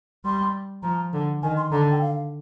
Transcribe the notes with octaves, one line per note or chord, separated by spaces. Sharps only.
G3 C6
F3 A#5
D3
D#3 G#5
C6
D3 A#5
G5
F5